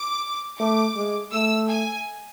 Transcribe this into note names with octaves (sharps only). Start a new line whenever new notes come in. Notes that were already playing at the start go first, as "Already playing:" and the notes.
Already playing: D6
A3 D6
G#3
A3 E6
G#5